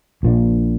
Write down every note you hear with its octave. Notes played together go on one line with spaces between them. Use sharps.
A#1 A#2 A#3 D4